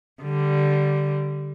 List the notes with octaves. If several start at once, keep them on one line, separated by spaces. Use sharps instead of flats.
D3 G3